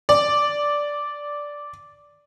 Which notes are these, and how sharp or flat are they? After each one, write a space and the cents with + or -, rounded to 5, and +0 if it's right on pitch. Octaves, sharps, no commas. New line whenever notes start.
D5 -5